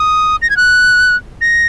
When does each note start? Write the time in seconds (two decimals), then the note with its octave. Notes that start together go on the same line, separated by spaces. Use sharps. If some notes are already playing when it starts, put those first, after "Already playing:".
Already playing: D#6
0.42 A#6
0.50 G#6
0.57 F#6
1.41 A#6